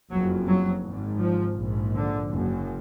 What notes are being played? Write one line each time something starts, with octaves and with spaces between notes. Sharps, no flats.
F#1 F2 F#3
F#3
G#1 G#2
F3
A#1 G#2
D3
F#1 F#2